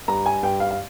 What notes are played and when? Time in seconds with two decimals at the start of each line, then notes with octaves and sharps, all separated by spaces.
0.08 G2 A#5
0.26 G#5
0.43 G2 G5
0.60 F5
0.71 F5